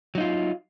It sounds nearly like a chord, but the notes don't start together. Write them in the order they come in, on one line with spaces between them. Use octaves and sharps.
F#3 D#4 F4